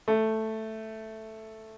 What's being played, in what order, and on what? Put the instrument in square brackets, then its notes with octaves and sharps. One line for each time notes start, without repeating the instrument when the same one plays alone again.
[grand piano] A3